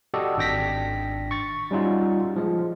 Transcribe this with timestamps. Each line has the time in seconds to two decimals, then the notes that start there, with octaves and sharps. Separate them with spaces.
0.14 F#4 G4 A4 D5 D#5
0.37 G#1 D4 G5 A#6 B6
1.31 C#6 A6
1.71 G3 C#4 D#4 F4 F#4
2.36 F3 G#3